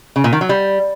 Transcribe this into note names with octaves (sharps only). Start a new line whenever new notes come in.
C#3
A#2
D#3
F#3
G3